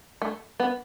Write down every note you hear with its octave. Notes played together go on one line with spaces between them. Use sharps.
A3
B3